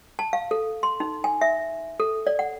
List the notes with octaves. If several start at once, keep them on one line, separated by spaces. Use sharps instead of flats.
A5
F5
A4
C6
D#4
G#5
E5
A4
D5
F#5